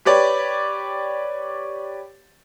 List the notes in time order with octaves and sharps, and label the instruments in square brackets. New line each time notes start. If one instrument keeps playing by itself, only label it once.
[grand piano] G4 B4 C#5 D5